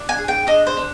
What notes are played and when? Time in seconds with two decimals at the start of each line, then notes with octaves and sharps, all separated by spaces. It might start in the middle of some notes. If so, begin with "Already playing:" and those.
Already playing: D4
0.09 G#5
0.18 G#4
0.28 G5
0.47 D4 D#5
0.67 C5
0.77 D4